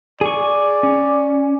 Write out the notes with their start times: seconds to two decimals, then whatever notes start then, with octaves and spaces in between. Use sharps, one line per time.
0.21 G#4 D5 C#6
0.83 C#4